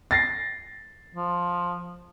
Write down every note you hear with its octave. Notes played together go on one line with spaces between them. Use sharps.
A6 A#6 C7
F3